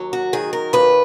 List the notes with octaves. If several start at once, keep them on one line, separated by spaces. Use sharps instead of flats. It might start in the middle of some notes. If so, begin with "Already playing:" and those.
Already playing: D#2 F#3
F#4
D#3 G#4
A#4
D#2 B4